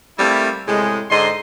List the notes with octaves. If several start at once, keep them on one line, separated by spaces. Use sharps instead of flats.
G3 A3 A#3 C4 E4
A2 C3 G#3
G#2 D3 D#5 C6